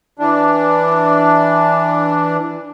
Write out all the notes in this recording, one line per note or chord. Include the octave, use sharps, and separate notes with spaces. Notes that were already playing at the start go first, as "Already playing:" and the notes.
E3 D4